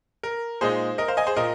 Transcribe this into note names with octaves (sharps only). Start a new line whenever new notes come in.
A#4
A#2 G#3 D#4 G#4 C5
A#4 D#5
C5 F5
D#5 G#5
G#4 C5
A#2 A#3 A#4 D#5